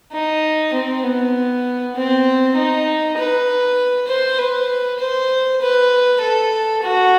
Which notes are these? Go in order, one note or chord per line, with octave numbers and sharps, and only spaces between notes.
D#4
C4
B3
C4
D#4
B4
C5
B4
C5
B4
A4
F#4